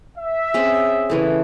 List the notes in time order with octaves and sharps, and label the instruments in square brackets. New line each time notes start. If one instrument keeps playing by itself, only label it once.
[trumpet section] E5
[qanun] C4 C#4 G#4
C#3 E3 A3